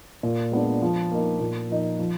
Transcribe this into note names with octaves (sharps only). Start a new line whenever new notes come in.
A#2
G#3 B3 D4
F3
A#3 D#4
A#2
F3 A#3 D#4
F3